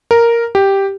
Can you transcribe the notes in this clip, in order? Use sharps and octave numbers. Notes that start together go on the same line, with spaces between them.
A#4
G4